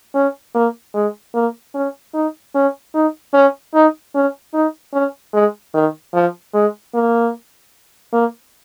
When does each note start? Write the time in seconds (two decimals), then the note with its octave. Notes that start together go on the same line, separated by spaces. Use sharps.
0.15 C#4
0.55 A#3
0.94 G#3
1.35 A#3
1.75 C#4
2.14 D#4
2.55 C#4
2.94 D#4
3.34 C#4
3.74 D#4
4.15 C#4
4.54 D#4
4.94 C#4
5.33 G#3
5.74 D#3
6.14 F3
6.54 G#3
6.94 A#3
8.13 A#3